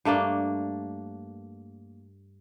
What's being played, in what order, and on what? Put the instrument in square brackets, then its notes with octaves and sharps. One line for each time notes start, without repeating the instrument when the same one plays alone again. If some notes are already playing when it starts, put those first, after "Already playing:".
[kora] G2 A3 A#3 D4